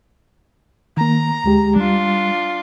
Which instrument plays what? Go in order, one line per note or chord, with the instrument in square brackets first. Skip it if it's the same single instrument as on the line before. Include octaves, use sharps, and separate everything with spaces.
[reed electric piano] D#3 A#3 [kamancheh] A#5
[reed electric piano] D2 G#3 G4
[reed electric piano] G3 [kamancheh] D4 F4